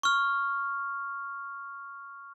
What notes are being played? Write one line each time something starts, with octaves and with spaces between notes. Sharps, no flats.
C#6 F6